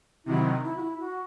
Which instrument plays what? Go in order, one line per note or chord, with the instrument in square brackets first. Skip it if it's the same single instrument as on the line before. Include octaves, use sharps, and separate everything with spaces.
[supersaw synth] C3 D#3 F#3 [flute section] E4
[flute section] D#4
E4
F#4
E4
F#4